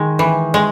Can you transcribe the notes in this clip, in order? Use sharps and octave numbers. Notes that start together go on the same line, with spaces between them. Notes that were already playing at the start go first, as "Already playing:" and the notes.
Already playing: D#3 G#3
E3
G#3